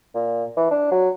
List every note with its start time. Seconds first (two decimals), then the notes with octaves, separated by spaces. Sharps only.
0.15 A#2
0.57 E3
0.71 D4
0.92 F#3